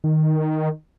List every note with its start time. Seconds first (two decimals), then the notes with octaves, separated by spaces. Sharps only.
0.04 D#3